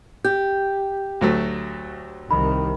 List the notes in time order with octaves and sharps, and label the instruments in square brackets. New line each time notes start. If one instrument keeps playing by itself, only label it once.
[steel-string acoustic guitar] G4 [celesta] G6
[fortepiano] D2 F#3 A3
[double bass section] C2 C3 D#3 [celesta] B5